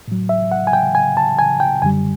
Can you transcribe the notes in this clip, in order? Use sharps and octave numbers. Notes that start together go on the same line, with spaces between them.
A2 F#3
E5
F#5
G#5
G5
G#5
A5
G#5
G5
F#2 D3 G3 G#5